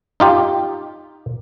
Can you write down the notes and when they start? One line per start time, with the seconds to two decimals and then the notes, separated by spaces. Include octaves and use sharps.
0.20 D#4 F4 G4